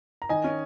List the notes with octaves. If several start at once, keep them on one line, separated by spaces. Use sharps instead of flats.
A#5
D#3 D#5 G#5
C#4